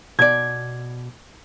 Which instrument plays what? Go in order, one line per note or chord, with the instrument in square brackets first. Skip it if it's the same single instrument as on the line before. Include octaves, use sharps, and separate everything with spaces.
[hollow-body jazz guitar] B2 D5 [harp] G#6